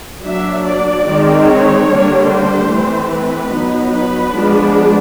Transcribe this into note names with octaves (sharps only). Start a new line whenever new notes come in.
F#3 A#3 D4 E5
D5
D#3 G#3 C4 D#4
C#5
D3 G3 A#3 D4
C5
E3 A3 C4
B4
F#3 B3 D#4
B4
F3 G#3 B3 D4